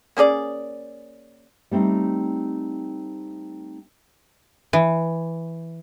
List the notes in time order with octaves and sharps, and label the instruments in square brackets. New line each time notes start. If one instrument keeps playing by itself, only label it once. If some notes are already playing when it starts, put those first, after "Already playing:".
[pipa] A#3 C#4 G#4 D5
[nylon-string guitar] G3 A3 C4 D#4
[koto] E3